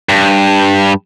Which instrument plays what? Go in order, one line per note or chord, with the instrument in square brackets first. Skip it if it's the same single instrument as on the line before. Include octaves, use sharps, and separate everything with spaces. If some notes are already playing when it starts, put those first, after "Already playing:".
[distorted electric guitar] G2